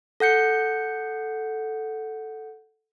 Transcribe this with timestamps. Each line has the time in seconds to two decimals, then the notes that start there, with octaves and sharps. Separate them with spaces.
0.20 A4 F#5 G6 C#7